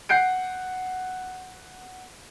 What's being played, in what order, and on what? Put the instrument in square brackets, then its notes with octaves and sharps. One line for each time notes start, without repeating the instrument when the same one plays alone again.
[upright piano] F#5 G6 C7 D7